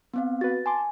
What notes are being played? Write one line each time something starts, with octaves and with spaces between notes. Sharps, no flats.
B3 C4 F5
F#4 B4 A6
G#5 A5 C6 D6